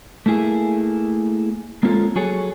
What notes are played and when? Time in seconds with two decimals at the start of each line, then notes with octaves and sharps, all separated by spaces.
0.26 A3 A#3 E4 G#4
1.83 G#3 A#3 C4 C#4 F4 A4
2.16 F#3 F#4 G#4 A4 C#5